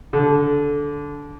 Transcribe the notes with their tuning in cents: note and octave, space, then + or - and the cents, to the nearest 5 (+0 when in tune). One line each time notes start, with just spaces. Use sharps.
D3 -15